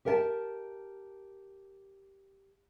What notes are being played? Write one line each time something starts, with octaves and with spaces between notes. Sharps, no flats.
G4 A#4 E5 F#5 A5